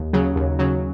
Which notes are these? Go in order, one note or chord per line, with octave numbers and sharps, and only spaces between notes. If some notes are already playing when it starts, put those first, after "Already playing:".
Already playing: D#2
C#3 F#3
D#2
C#3 F#3